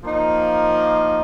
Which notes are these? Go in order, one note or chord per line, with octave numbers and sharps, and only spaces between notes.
F3 A#3 D#4